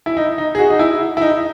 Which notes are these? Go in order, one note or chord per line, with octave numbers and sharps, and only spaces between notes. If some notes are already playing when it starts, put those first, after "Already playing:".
E4
D#4
D#4
G#4
F#4
D#4
E4
E4
D#4